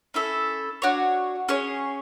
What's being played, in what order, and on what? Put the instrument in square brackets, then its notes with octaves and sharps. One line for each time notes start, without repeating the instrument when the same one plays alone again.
[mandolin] C#4 E4 A4 E5
D4 F#4 C#5
C#4 G#4 C#5